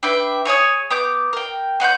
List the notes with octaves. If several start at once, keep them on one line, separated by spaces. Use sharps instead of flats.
D4 B4 E5 G5
G#4 C#5 G#5 C#6
B3 D6 G6
A#4 G5
B3 F#5 C6 G6